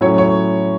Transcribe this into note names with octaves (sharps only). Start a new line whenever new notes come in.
A2 F#3 C#4 C#5
C#5